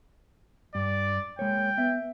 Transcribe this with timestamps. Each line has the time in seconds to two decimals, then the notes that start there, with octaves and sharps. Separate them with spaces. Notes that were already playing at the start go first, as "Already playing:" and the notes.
0.75 G2 D5
1.39 G#3 A#3 C#5 G5
1.78 B3 E5